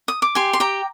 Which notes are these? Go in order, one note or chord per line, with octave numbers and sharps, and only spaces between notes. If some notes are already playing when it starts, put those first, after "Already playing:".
D#6
D6
G4 G#5 C6
C6
G4 G5 A#5